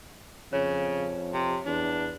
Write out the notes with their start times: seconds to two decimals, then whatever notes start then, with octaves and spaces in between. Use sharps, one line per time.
0.53 F2 C#3 C#5
1.34 C3
1.66 E2 D4